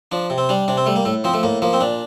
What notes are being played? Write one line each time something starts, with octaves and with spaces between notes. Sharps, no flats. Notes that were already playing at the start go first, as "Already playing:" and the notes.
F3 D4
C3
C4
G3 D4
C3 D4
C4
G3 A3
A#3
A2 A3
F3 C4
A3
A2 A#3
F3 A#3
C4
A#2 D4